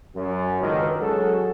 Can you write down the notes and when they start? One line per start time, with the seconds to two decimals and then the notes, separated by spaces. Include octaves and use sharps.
0.15 F#2
0.61 C#2 G#2 B2 D3 D#3
1.00 F#3 G#3 C#4 F#4 G#4 A4